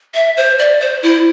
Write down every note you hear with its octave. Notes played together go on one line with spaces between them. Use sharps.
E5
C5
D5
C5
E4